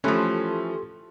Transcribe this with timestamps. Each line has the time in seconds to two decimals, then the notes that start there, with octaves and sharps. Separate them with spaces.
0.04 E3 F3 A3 C#4 G4 A4 C6